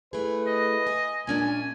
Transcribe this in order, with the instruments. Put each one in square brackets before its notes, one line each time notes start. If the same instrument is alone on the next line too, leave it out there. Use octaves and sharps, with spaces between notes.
[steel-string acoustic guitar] A3 G#4 [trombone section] E4 B4
[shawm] D#5
[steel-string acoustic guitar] G#5
[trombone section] A#2 [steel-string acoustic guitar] G#3 C#4 D4 [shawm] G#5